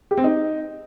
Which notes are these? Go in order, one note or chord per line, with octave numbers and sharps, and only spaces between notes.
G4
C4
D#4